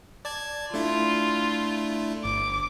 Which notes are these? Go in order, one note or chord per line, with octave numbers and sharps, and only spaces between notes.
D5 A5 G#6
A3 D4 E4 F4
G1 D6